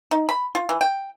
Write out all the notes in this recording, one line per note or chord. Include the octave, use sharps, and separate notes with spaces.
D#4
B5
F4
E3
G5